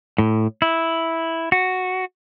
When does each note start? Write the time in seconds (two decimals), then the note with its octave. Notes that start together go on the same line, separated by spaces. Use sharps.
0.18 A2
0.62 E4
1.52 F#4